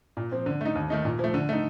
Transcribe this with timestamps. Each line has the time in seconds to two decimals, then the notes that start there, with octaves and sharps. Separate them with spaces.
0.17 A#2
0.31 F3 C4
0.46 D3
0.61 A3 D#4
0.75 D#2
0.90 D#3 A3 D#4
1.05 A#2
1.19 F3 A3
1.34 D3
1.49 A3 D#4